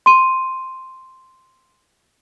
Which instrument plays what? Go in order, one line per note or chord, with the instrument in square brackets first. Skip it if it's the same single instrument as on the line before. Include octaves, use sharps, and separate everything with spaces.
[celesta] C6 D#7